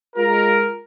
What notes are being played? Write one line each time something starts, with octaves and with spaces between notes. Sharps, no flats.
G#3 F4 A#4